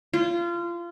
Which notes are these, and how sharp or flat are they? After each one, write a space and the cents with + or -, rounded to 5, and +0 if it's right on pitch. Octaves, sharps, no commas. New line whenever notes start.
F4 -25